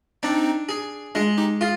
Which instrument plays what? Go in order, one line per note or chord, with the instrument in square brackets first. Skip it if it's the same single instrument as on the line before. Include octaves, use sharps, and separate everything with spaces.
[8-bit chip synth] C4 D#4 [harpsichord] D4
[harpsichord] G#4
[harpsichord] G#3 [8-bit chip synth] D4 F4
[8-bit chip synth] D#4 G4
[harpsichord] F4 [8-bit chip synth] G#4